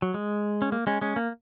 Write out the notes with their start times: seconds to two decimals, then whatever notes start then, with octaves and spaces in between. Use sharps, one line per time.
0.02 F#3
0.14 G#3
0.62 C#4
0.72 A#3
0.87 G#3 C#4
1.01 G#3 C#4
1.16 A#3